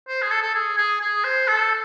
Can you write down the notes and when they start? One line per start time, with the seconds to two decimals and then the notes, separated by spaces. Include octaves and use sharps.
0.08 C5
0.22 G#4
0.31 A4
0.42 A4
0.55 G#4
0.77 G#4
1.01 G#4
1.24 C5
1.48 A4